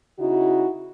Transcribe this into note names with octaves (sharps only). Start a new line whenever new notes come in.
C#3 D#4 E4 F#4